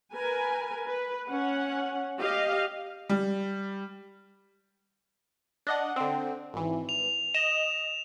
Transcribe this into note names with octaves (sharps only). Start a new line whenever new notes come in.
A#4 B4 G#5
B4
C#4 F#5
G4 D#5 F5
G3
D4 D#5 F#5
D3 C4
G#1 E3
F7
D#5 E7